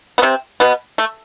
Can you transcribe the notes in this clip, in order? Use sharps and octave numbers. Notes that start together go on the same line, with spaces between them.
B3
C3 C4
B2 B3
A3